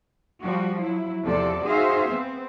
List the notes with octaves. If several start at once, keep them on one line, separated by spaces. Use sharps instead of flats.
F3 G3 F#4
F#3 E4
E2 C3 F3 A4 D5
D#4 F#4 G#4 C5 E5 F5
B3 C4